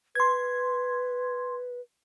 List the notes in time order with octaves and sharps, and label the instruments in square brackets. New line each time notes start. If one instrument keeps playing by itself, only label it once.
[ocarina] B4 [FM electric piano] C6 G#6